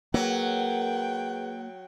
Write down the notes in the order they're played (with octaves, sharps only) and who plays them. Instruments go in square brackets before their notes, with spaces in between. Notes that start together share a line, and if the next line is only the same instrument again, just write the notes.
[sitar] F#3 [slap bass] A#3 [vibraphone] G#4 B4 [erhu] G5